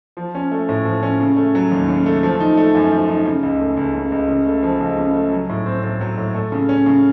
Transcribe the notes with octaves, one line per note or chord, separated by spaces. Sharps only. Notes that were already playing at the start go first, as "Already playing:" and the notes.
F3
C#4
A3
A2
F3
C#4
C#3
A3
F#3
D#2
C#3
A3
F3
D#4
A3
F#2
F3
D#4
C#3
C#2
A3
C#2
C#3
C#2
C#3
A3
F3
C#2
C#3
A3
F#3
A2
C4
A2
F#3
A2
A3
C#3
C#4
C#3